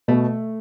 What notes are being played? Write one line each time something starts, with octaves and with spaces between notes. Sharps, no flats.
B2 A3